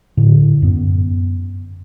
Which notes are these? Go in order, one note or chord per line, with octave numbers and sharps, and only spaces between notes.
A2 D3
F#2 B3